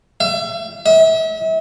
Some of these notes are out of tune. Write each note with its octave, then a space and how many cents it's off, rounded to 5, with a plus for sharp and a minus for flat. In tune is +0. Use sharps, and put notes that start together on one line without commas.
E5 +35
E5 -35